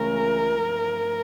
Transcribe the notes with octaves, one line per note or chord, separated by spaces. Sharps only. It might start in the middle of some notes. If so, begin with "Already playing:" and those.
Already playing: C#2 C#3 E3 A3 C#4 A#4
G2 F3 A3